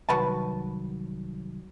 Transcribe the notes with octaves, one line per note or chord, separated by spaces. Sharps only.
C2 D#3 F#3 F#4 B4 A5